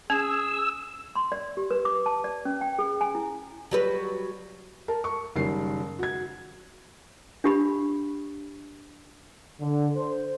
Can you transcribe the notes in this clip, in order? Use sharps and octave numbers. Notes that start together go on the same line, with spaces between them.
C#4 G#4 E6
C6
D5
G4
B4
D6
A5
D5
C#4
G5
G#4
G#5
E4
F#3 G3 B4
A#4 A5
C#6
F#1 D#3 G3 C7
F#4 G#6
D4 G4 B5
D3
C5